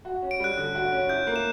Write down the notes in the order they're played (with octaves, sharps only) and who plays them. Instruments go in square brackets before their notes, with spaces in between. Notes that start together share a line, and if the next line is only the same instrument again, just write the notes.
[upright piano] F#4
C#4
[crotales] D7
[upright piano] G3 [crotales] F#6
[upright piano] D3
F#4
C#4
[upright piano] E4 [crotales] G6
[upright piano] A#3
[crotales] E7